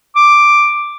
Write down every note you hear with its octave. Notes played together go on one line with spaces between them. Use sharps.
D6